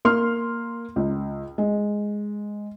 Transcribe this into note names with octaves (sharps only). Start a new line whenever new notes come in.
A#3 C6 F6
C#2
G#3